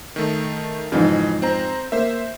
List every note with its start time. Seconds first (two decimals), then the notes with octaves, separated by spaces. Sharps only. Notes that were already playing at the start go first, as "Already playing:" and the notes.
0.16 D#3 A3
0.92 F2 G#2 C#3 E3
1.42 C4 C5 A#5
1.92 A#3 C5 E5